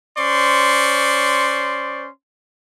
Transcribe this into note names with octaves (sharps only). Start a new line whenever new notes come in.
C#4 C5 D5 C6 C#6